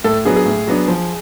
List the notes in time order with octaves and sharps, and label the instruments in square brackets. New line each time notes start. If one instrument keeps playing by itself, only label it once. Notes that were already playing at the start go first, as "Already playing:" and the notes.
[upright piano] A2 [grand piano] A4
[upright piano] F#3 B3 D4 [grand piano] G#4
[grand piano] G#4
[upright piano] A2
F#3 B3 D4
F3